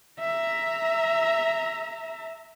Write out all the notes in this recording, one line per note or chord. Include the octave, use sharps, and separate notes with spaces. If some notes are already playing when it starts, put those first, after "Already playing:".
E5 A#5